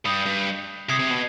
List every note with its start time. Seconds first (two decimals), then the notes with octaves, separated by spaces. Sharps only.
0.05 G2 B5 D#6 G6 C7 F7
0.26 G2
0.89 C3 D#6 G#6 C7
0.99 C3
1.10 B2